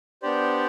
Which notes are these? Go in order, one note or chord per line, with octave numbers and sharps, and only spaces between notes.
B3 D4 G4 C5 D5